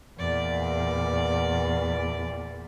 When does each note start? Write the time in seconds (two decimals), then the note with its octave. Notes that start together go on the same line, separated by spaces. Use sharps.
0.18 E2 A#2 D5